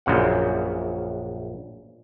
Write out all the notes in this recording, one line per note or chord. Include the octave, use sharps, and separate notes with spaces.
A#1 F#2 C#3 F#5